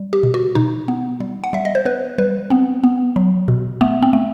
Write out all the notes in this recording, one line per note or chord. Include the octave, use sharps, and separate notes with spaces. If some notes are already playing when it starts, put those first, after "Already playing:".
Already playing: G3
G4
B2
F#4
B2 D#4
B3
G3
F#5
G3 E5
D#5
C5
B3 B4
G3 B4
B3 C4
B3
F#3
B2
A3 B3
C4
A3